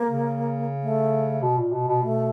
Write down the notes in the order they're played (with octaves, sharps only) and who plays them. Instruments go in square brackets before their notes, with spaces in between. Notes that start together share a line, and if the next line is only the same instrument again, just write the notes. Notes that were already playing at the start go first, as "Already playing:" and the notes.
Already playing: [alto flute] A#3
[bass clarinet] C#3
[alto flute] A3
[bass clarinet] B2
A#2
B2
B2
[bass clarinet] B2 [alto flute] A3